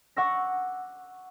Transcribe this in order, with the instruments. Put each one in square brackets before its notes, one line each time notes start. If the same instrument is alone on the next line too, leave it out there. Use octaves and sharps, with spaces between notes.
[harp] F#5 C#6 D6 E6 A#6